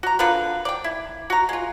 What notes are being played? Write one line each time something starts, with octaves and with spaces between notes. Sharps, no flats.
F#4 A#5
D3 F4 A#4 B4
D5 G5
E4
F#4 A#5
G#3 F4